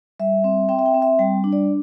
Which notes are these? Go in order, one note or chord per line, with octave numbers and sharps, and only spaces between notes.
G3 E5
C4
C4 G5
E5
G5
C4
E5
G3 G5
D4
D5